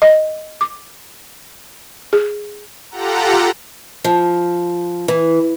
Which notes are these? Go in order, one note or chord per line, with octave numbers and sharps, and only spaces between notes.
D#5
D6
G#4
F4 G4 A4 F#5 A#5
F3
E3